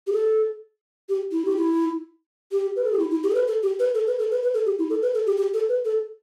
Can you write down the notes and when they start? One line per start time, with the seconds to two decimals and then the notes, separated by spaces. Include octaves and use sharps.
0.07 G4
0.13 A4
1.09 G4
1.32 E4
1.45 G4
1.57 E4
2.52 G4
2.76 B4
2.84 A4
2.92 G4
2.99 E4
3.11 E4
3.23 G4
3.30 A4
3.35 B4
3.48 A4
3.63 G4
3.79 B4
3.94 A4
4.07 B4
4.19 A4
4.31 B4
4.43 B4
4.54 A4
4.66 G4
4.79 E4
4.90 A4
5.02 B4
5.14 A4
5.26 G4
5.37 G4
5.54 A4
5.69 B4
5.85 A4